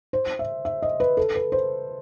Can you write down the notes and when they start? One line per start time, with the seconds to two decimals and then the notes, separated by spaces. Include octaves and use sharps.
0.13 C5
0.39 E5
0.65 E5
0.82 D#5
1.00 B4
1.17 A4
1.35 B4
1.52 C5